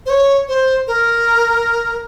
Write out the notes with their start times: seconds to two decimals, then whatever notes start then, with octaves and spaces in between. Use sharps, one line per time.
0.06 C5
0.10 C#5
0.48 C5
0.87 A#4